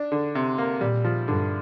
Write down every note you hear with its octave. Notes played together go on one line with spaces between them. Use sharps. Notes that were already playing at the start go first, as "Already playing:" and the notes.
Already playing: D4
D3
C3
A#3
A#2 G3
F3
G2 D3